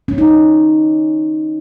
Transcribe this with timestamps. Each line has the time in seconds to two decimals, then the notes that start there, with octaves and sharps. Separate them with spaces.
0.08 C#4
0.18 D#4